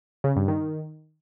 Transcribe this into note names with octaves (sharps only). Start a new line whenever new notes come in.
C#3
G2
D#3